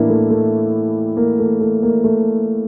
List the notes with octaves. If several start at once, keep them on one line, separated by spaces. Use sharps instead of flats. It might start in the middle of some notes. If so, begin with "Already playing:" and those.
Already playing: A2 E3 A#3 D4 E4
A3
A3
A#3
A3
A3
A#3
A3